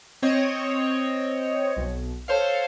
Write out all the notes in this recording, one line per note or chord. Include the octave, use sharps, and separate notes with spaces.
C4 C#5 D#5
B1
A4 C5 C#5 F5